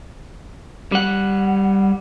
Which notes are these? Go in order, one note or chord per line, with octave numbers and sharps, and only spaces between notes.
G3 F#5